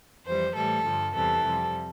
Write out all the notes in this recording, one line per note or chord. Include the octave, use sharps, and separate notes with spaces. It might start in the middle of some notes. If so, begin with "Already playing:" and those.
F2 E3 G3 C5
A2 E3 G3 A4
G2 D3 F3
E2 C3 E3 G3 A4
F2 C3 G3